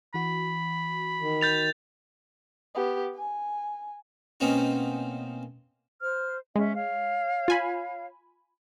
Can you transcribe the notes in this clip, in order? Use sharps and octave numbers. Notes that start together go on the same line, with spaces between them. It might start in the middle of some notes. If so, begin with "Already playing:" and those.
E3 F#4 B5
D#3
G6 A6 F7
B3 G4
G#5
B2 A#3 C4 C#4 D#4
C5 F6
G#3 C#4 E5
C#5 F5
F4 G#5 B5